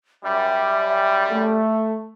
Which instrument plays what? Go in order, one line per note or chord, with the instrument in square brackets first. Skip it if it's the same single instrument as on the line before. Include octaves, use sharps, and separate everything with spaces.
[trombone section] F#2 G3 [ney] E5
[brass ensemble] A3